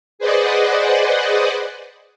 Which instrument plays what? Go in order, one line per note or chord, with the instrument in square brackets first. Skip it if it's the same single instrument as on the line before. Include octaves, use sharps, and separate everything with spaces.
[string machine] G#4 B4 C5 D5 D#5 F#5